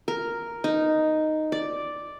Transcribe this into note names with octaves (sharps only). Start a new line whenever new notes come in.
A#4
D#4
D5